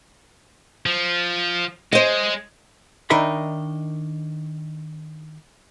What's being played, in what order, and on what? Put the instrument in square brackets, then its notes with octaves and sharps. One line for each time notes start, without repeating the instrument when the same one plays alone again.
[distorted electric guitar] F3
[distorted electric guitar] G#3 [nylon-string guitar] C5 D#5
[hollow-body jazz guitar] D#3 D4 D#4 A#4 E5 B5